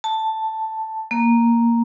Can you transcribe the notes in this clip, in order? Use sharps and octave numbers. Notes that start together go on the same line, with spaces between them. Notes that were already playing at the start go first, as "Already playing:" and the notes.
A5
A#3